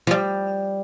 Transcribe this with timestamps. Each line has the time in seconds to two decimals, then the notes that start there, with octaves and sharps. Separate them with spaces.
0.07 F3
0.11 G3